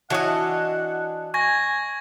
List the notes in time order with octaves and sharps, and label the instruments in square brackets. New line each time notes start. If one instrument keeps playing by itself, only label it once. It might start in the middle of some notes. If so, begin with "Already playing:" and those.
[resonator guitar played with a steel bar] E3 F#4 C#5 [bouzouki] D4 D#5 [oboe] F#5
[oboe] G#5 [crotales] C#6 G#6 A#6